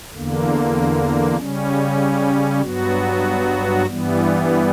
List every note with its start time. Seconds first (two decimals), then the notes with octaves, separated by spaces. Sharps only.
0.12 E2 D3 A#3
1.36 C#3 G3 C#4
2.61 G2 F#3 B3 F#4
3.86 G2 E3 G3 B3